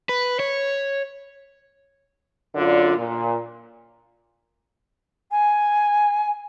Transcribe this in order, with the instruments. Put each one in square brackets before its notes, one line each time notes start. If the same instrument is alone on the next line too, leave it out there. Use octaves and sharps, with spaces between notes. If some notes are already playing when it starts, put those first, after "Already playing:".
[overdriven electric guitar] B4
C#5
[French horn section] F#2 D3 F4 D5
A#2
[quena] G#5